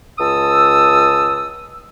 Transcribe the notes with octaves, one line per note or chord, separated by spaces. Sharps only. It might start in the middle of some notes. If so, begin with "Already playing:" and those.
C#2 A5 D#6 E6